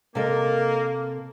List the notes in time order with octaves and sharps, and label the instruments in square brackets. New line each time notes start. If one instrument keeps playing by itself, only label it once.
[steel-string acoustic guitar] C3 A4 D#5 [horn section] A#3